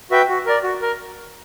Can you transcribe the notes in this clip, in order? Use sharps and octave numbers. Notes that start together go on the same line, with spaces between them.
F#4 B4 E5 G5
F#4
A#4 D5
F#4
A#4